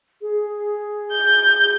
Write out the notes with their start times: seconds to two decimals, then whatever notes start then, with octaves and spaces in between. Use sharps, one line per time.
0.21 G#4
1.12 G6